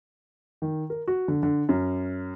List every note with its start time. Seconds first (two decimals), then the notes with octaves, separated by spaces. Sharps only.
0.62 D#3
0.90 A#4
1.08 F#4
1.28 D3
1.43 D3
1.69 F#2